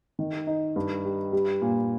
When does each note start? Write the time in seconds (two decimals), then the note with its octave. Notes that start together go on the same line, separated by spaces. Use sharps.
0.19 D#3
0.47 D#4
0.76 G2
1.05 G3
1.32 G3
1.62 A#2